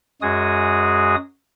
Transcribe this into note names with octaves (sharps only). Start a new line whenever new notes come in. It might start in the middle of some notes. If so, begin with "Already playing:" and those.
F#2 G#3 F#4 G#4 D#6